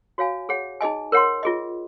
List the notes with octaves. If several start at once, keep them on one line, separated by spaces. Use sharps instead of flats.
F#4 C#5 F5 G#5
G#4 C#5 F#5
D#4 G#4 D#5 G#5
A#4 C#5 F#5 C6
F4 G#4 D#5